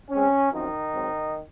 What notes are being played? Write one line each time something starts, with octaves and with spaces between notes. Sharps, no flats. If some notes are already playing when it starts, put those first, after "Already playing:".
C#3 G#3 C4 C#4
F#2 D#3 F3 C4 D#4
G#2 F#3 C4